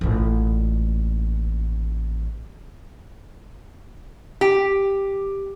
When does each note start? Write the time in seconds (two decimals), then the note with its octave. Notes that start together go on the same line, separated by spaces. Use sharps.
0.01 A1 A#2
4.41 G4